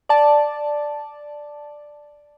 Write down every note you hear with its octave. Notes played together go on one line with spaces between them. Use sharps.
D5 A5